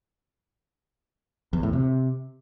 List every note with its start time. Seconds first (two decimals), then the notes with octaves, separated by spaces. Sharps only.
1.53 E2
1.63 A2
1.73 C3